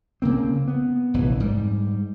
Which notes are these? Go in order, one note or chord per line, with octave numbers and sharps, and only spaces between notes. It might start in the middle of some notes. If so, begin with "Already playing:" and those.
C#3 A#3 C4
B3
F1 A#1 E3
G#2 G3